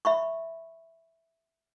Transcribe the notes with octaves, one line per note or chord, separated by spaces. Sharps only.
E5 B5 C#6